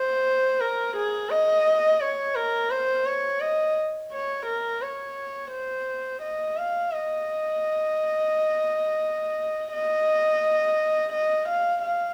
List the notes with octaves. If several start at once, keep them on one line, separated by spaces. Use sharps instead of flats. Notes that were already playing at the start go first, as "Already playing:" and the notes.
Already playing: C5
A#4
G#4
D#5
C#5
A#4
C5
C#5
D#5
C#5
A#4
C#5
C5
D#5
F5
D#5
D#5
D#5
F5
F5